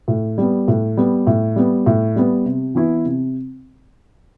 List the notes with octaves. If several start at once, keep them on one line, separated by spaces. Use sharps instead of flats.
A2
G3 B3
A2
G3 B3
A2
G3 B3
A2
G3 B3
C3
E3 B3 E4
C3